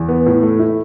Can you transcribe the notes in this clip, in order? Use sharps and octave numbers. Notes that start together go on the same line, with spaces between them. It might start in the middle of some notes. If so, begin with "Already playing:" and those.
Already playing: E2
B3
A2
A3
E4